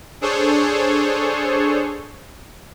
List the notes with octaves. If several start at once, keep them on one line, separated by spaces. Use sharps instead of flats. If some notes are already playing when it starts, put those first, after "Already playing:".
D4 G#4 A4 C5 C#5